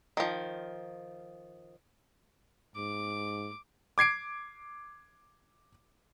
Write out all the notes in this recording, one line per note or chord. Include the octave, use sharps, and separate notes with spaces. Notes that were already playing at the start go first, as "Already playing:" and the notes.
D#3 F3
G#2 D6
D6 G#6 C7 D7